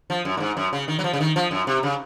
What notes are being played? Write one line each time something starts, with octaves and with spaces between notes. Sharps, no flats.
F3
F#2
A#2
G#2
F#2
C#3
D#3
F#3
F3
C#3
D#3
F3
F#2
C3
C#3